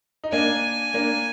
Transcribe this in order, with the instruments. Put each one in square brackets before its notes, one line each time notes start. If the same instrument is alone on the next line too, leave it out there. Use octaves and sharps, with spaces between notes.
[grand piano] D#4
[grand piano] A#3 D4 [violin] G#5
[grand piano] A#3 D4